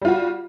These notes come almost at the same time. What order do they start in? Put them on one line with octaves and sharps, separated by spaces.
G3 F4 F#4